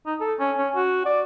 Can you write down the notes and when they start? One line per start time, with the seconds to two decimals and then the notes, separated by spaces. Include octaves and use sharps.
0.06 D#4
0.20 A4
0.39 C#4
0.58 C#4
0.75 F#4
1.06 D5